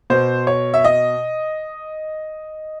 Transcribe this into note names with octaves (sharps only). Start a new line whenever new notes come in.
B2 C5
C#5
E5
D#5